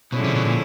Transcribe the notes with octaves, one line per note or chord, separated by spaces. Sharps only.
B2 D3 F3 G#3 C#4 E4
C3
B2
A#2